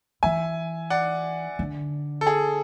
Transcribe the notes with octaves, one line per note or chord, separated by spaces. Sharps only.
E3 E5 G#5
D5 F#5
D3
A4
G#4